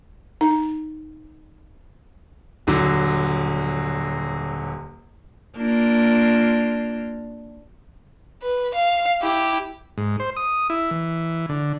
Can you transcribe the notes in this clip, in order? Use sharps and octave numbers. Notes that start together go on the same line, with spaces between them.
D#4
D#1 D3 F#3
A#3 D4 F4
B4
F5
E4 G4
G#2
C5
D#6
E4
E3
D3